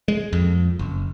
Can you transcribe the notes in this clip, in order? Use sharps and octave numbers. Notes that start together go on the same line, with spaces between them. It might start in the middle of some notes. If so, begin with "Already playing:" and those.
G#3
F2
F#1